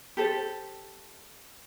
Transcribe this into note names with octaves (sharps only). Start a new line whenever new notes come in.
G4 A4 C5